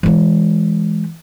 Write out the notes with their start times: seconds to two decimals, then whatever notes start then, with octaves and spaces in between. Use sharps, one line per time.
0.03 E3 G#3